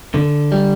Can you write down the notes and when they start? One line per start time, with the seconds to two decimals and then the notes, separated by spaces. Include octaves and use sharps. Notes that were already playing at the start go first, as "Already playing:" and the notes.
0.14 D3
0.52 G3